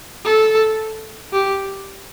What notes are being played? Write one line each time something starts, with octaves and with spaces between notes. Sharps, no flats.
A4
G4